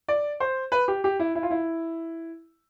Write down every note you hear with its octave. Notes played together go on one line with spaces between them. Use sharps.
D5
C5
B4
G4
G4
E4
E4
F4
E4